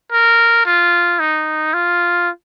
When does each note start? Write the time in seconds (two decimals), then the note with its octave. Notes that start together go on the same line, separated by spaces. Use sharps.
0.12 A#4
0.66 F4
1.20 D#4
1.74 F4